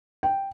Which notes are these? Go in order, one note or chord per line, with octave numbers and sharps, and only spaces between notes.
G5